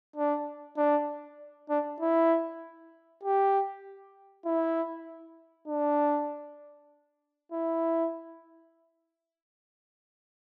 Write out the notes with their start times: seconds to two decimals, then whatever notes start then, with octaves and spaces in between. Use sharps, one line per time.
0.16 D4
0.77 D4
1.70 D4
2.00 E4
3.24 G4
4.45 E4
5.67 D4
7.52 E4